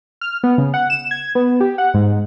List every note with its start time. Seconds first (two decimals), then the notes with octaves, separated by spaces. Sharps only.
0.21 F6
0.43 B3
0.58 C#3
0.74 F#5
0.90 E7
1.11 G#6
1.35 B3
1.60 G4
1.78 F#5
1.94 G#2